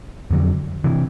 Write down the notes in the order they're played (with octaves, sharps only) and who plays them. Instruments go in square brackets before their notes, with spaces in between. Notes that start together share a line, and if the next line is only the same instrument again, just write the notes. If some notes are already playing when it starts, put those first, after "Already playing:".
[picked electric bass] F2 D3 F#3
C3 E3